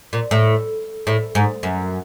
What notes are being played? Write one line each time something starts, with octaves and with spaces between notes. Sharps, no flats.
A#2
A2
A2
G#2
F#2